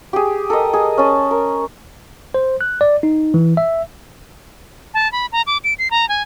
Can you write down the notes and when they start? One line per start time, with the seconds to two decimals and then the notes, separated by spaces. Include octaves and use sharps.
0.13 G4 G#4
0.50 A4 A#4 D#5
0.73 G#4
0.98 C#4 A5
1.31 A#4
2.34 C5
2.61 F#6
2.81 D5
3.03 D#4
3.34 E3
3.57 E5
4.94 A5
5.12 B5
5.32 A#5
5.47 D6
5.64 D7
5.79 C7
5.91 A#5
6.09 G#5